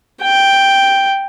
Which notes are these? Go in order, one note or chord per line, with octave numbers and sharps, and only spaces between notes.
G5